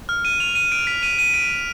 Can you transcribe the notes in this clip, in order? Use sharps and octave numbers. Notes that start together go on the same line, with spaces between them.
F6
D#7
F7
D#7
D7
B6
D#7
D#7
D7